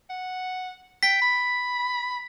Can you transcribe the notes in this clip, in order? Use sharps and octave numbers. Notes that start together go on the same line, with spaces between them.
F#5
G5 B6
B5